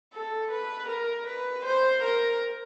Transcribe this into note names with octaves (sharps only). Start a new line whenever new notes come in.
A4
B4
A#4
B4
C5
A#4